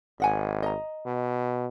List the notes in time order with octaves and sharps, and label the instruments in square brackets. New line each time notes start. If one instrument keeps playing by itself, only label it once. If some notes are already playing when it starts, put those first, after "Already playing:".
[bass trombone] G#1 [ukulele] D#5 F#5 G#5
[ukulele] D#5 A#5
[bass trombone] B2